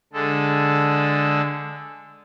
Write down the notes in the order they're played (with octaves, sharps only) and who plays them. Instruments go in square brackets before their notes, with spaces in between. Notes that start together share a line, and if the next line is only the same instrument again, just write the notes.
[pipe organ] D3 G#3 A4